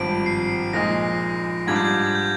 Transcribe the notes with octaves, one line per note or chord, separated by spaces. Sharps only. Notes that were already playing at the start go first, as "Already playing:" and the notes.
Already playing: G#1 G2 F3 C4 D7
C7
A#1 A#2 F3 G#3 D#4 A#6
G#2 G3 D4 F4 G#6
G6
G#6
G6